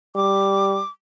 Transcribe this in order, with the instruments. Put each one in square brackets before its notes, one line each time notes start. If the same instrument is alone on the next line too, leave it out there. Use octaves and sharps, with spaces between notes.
[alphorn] G3 [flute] D6